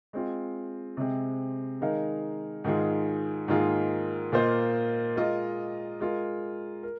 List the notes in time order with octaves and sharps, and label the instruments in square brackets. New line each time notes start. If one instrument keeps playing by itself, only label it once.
[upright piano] G#3 C4 F4
C3 G#3 C4
D#3 G#3 D#4 A#4 F5
G#2 D#3 G#3 F4 G#4
G#2 D#3 A#3 F4 G#4
A#2 A#3 F4 C5 D#5
G#3 F4 A#4 D#5
G#3 F4 A#4
A#4